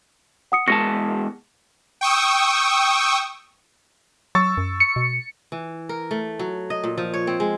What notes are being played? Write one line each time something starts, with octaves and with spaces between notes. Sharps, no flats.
F#5 D#6 C#7
E2 G#3 A5 C#6 A#6 C#7
G5 C#6 D#6 E6
F#3 C#6 E6 A6
F#2
C#7
B2
E3
A#4
A3
F#3
D#5
A#2
F3
C#5
C4
G#3